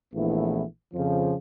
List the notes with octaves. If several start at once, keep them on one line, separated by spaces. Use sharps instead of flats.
A#1 E3 A3 B3 E4
F2 C#3 F3